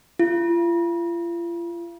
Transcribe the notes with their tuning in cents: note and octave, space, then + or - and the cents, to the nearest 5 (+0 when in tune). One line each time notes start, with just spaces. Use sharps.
F4 -40